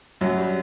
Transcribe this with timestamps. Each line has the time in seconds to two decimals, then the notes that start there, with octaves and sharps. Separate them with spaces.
0.21 F#2 F#3
0.38 G3